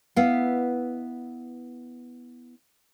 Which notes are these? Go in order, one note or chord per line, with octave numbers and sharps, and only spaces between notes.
B3 E4 F5